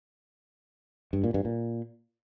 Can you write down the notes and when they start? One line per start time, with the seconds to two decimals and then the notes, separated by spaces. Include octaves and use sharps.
1.13 G2
1.24 A#2
1.34 G2
1.45 A#2